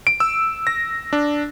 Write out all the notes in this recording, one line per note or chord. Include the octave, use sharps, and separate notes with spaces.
D7
E6
A#6
D4